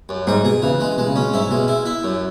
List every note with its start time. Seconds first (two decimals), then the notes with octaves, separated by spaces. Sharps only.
0.09 F#2
0.27 G#2 G#4
0.44 B2 G#4
0.62 C#3 E3
0.80 G#3
0.97 B2 G#3
1.07 C#3
1.16 B2 C#4
1.33 G#2 E4
1.51 B2 G#3
1.68 E4
1.86 E4
2.04 F#2